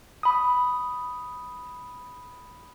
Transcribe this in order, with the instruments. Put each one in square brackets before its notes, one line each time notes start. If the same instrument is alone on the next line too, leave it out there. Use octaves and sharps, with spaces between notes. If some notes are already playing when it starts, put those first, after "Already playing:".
[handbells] B5 D#6